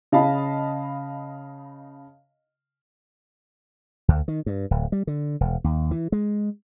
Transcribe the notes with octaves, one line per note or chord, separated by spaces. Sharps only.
C#3 D#5 F5 A5 B5
D2
D#3
G2
D1
G3
D3
E1
D#2
E3
G#3